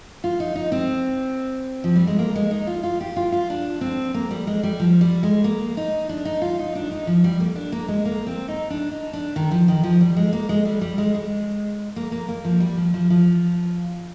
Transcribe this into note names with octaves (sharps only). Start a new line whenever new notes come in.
F4
D#4
D#4
C4
F3
G3
G#3
A#3
G#3
D#4
F4
F4
G4
F4
F4
D4
C4
A#3
G3
G#3
G3
F3
G3
G#3
A#3
D#4
D4
D#4
F4
D#4
D4
D#4
F3
G3
A#3
D4
A#3
G#3
A#3
C4
D#4
D4
D#4
D4
D#3
F3
D#3
F3
G3
G#3
A#3
G#3
G3
G3
G#3
G#3
A#3
A#3
A#3
F3
G3
F3
F3
F3